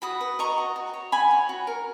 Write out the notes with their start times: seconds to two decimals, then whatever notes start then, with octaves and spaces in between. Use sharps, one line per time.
0.02 F#4 B5 D#6
0.21 B4
0.39 D#5 A#5 C#6
0.58 F#4
0.76 F#4
0.94 C#5
1.12 F#4 G#5 B5
1.31 C#5
1.49 F#4
1.67 A#4